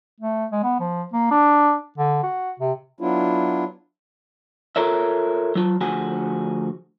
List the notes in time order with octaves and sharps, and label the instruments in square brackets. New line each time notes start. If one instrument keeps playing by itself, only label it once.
[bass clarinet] A3
G#3
B3
F3
A#3
D4
D3
F#4
C3
[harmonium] F#3 B3 D4 E4 F4
[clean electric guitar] F4 A4 A#4 C#5 E5
F#3 F4
D2 F3 F#4 G#4 G#5